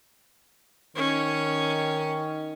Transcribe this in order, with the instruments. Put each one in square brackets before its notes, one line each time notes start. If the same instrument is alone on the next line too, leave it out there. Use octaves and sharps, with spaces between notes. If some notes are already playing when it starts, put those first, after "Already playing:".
[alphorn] D#3 [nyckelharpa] C#4